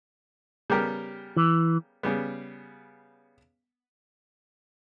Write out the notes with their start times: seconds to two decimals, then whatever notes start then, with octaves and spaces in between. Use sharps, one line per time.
0.70 C#3 G3 B3 G4 A#4
1.36 E3
2.03 C#3 G3 B3